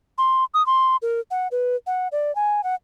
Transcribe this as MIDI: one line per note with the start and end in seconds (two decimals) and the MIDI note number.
0.18 0.44 84
0.54 0.65 87
0.66 0.96 84
1.02 1.20 70
1.31 1.48 78
1.52 1.76 71
1.87 2.08 78
2.12 2.34 74
2.36 2.64 80
2.64 2.75 78